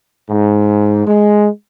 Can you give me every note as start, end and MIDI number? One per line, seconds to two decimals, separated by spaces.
0.30 1.05 44
1.06 1.47 56